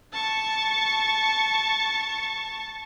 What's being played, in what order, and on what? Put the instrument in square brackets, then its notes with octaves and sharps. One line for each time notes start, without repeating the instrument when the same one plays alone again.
[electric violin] A5 C#6